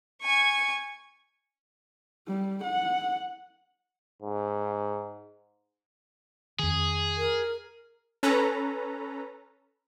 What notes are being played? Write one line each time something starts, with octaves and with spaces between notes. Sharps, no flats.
G#5 C#6
G3
F#5
G#2
F2 D#3 G#4
A#4
C#4 A4 B4 A#5